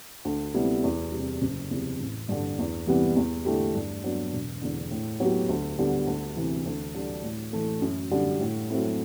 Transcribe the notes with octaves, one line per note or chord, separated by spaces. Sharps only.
D2
C3 G3 B3 E4
E2
C3 G3
F#1
E2 C3
A1
G2 D3
E2
C3 E3 G3 B3
E2
D3 A3 E4 G4
G2
F#3 B3 D4
E1
E2 D3
A2
F#3 B3 E4 G4
D2
D3 G3 B3
D2
C3 E3
D2
D3 G3 D4 G4
A2
E3 A3
F#2
D3 G3
A2
F#3 A3 C4 E4